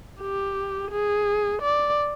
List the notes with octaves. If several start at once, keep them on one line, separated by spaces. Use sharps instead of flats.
G4
G#4
D5